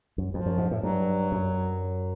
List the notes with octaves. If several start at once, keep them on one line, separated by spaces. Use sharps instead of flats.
F#2
F2 F3
F#2
G#2
A2
G2 F#3
F#2